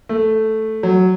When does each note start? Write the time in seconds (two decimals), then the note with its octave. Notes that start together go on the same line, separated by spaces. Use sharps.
0.09 A3
0.83 F#3